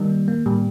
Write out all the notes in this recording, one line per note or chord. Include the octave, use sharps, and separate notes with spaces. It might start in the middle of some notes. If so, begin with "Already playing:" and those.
Already playing: D#3 G3
A#3
A#3
A2 G3